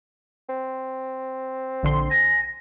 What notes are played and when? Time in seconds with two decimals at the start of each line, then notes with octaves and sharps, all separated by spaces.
0.49 C4
1.83 A#1 D3 C6
2.11 G#5 A#6